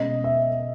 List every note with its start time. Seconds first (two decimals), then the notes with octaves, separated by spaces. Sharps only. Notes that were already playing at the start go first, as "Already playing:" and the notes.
Already playing: B2 G#3 C#4 D#5
0.24 E5